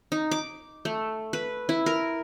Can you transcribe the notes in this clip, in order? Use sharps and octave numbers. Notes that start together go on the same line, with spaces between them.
D#4
D6
A3
B4
E4
A#4